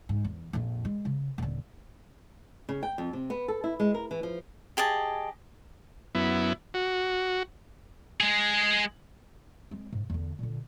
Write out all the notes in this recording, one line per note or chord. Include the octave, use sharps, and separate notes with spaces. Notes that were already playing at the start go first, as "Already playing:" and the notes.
G#2
E2
A#1 F2
G#3
C#3
D#1 D3
C#3
G5
F2
C3
B3
A4
E4
G#3
A#4
E3
F3
G4 G#4 D#5 A5
F#2 B3 E4
F#4
G#3 G#4
G#3 C4
G#2
E2 D3
A#2 D3